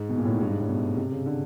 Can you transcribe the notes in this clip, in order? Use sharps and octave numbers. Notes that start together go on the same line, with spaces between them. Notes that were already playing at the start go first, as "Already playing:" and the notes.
Already playing: G#2
B2
A#2
A2
G#2
G2
G#2
A2
B2
C3
C#3
D3